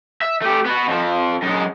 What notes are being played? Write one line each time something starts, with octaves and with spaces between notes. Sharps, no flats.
E5
A3 G4
B3 F#4
F2 F3
F#2 G#3